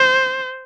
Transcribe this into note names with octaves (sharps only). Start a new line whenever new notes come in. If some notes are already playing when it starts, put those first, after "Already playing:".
Already playing: C5